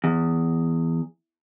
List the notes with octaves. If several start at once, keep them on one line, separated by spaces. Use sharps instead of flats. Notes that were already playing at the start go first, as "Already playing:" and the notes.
E2